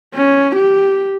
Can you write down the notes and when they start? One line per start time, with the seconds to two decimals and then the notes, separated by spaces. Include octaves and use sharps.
0.15 C#4
0.56 G4